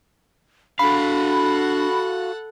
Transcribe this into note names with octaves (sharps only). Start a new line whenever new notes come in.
D4 F#4 A4 F5 F#5 B5